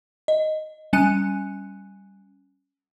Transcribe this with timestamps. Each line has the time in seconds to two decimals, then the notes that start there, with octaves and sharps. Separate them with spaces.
0.28 D#5
0.93 G3 C#4 G#5 F#6 C#7 D#7